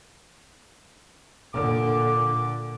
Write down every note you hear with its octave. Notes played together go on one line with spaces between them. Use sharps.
A#2 D3 D6